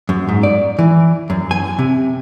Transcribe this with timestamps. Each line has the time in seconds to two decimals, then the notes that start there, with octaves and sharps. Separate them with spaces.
0.09 F#2
0.29 G#2
0.43 D5
0.79 E3
1.30 F#2
1.51 G#5
1.79 C3